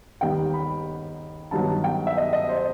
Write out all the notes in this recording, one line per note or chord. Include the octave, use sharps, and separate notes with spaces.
D#2 D#3 G3 B3 D#4 G5
B5
G2 D#3 F#3 B3 A5
G5
E5
D#5
D#5
C5